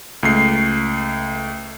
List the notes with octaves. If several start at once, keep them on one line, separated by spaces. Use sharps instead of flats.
C#2 A3 C7